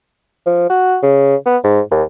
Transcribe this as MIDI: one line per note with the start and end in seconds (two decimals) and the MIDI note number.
0.46 0.69 53
0.69 0.97 66
1.03 1.36 49
1.46 1.57 59
1.64 1.81 44
1.91 2.03 39